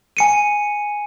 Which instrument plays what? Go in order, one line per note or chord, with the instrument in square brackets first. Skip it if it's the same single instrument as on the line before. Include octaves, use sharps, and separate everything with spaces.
[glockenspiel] G#5 C#7 D#7